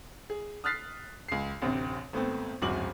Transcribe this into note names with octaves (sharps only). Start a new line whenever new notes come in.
G#4
D#6 F6 F#6 A6 B6 C7
C#2 C7
A1 D2 C3 C4
G#1 A3 B3 C4
D1 G#1 F#2 F#4 D6 F#7